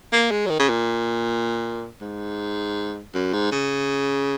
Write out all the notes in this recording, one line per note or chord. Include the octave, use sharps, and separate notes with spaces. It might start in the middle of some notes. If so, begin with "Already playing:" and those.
A#3
G#3
F#3
D#3
C#3
A#2
G#2
F#2
G#2
C#3